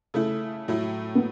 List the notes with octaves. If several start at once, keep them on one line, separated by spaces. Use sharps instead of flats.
C#3 A3 E4 A4
A2 F#3 A3 E4
B3